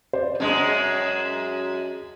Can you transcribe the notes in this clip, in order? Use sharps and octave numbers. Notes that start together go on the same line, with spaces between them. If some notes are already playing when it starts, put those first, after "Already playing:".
C5 D5
F#2 G#3 D4 D#5